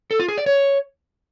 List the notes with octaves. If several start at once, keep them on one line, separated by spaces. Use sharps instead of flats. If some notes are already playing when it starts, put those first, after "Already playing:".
A4
F4
G#4
D5
C#5